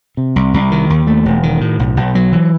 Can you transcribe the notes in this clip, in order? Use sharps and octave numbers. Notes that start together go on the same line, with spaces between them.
C3
C2
C2
D#3
D#2
A3
E1
D#3
A2
B1
B1
F#3
E3